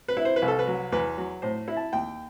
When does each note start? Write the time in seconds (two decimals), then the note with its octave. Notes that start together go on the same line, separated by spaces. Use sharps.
0.08 B4
0.17 E4
0.25 C5
0.36 B4
0.42 C2
0.48 A4
0.59 B4
0.67 F#3
0.92 E2 B4
1.17 F#3
1.42 A2 C5
1.68 E4
1.76 A5
1.93 D#2 G5